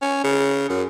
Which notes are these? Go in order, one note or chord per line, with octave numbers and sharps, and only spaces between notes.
C#4
C#3
F#2